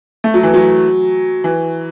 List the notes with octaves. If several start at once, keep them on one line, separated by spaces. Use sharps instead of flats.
A3
F#3
E3
F#3
E3